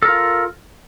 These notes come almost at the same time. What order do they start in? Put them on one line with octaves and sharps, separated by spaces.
A4 A#4 F4